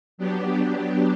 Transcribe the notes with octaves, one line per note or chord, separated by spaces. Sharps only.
F#3 B3 D4 G4